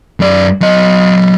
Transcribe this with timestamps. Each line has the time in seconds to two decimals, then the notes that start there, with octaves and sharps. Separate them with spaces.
0.20 F#2 D5
0.61 F#3 D#5